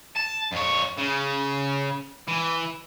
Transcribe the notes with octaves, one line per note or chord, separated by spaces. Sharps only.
A5
F2 C#5
C#3
E3